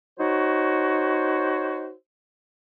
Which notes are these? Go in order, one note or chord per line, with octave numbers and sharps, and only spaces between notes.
D#4 F#4 C5 C#5